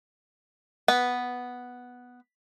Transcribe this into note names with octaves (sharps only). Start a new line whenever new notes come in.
B3 B4